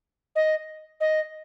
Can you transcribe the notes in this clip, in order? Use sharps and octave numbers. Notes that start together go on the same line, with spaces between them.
D#5
D#5